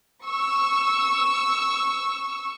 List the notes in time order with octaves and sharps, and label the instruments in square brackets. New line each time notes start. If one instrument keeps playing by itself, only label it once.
[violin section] C#6 E6